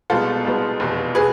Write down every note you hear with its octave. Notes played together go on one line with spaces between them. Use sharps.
C2 B2 G#3 B3 F4 A4
C2 B2 G#3 B3
F1 E2 B2
B2 G#4 B4